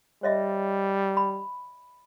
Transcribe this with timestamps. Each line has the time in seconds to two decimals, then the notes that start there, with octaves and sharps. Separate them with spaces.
0.23 G3 C#5 D#5 E5
1.17 B5